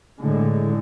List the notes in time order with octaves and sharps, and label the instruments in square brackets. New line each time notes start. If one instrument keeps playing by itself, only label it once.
[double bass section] A2 D3 G#3